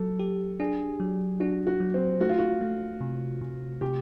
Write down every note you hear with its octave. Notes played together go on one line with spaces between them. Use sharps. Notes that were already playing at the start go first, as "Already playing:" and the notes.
Already playing: F#3 A4
G4
D4 G#4
F#3
D4 F#4
F#4
F#3
C4
A3 F#4
F4
F#4
A3
C3
C3
C3 G4